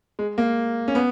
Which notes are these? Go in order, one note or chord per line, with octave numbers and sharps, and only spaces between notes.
G#3
A#3
C#4
B3